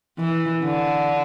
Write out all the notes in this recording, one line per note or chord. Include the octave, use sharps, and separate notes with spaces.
E3
D3